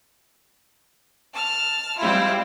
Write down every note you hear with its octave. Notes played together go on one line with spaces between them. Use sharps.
A5 F6
G3 G#3 C4 E4 F4